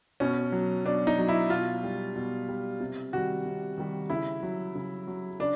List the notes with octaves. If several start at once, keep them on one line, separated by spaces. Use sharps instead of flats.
B2 C#4
F#3
B2 D4
D#4
F#3
E4
B2 F4
G3
B2
G3
C3
D#3 G3 F#4
C3
D#3 G3
C#3 E4
F#3
C#3
F#3
C#3 D4